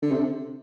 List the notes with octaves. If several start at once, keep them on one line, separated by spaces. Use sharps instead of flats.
D3
C3